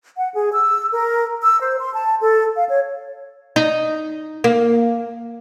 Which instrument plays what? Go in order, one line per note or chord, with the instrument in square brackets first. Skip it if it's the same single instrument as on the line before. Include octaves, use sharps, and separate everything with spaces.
[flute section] F#5
G#4
E6
A#4
E6
C5
C6
A5
A4
F5
C#5
[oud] D#4
A#3